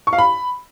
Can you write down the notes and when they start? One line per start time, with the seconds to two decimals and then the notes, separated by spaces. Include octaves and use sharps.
0.07 C#6
0.13 F5
0.18 B5